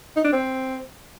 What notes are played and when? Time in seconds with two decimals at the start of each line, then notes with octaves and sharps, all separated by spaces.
0.16 D#4
0.24 D4
0.33 C4